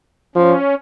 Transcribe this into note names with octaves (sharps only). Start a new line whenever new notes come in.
F3 C#4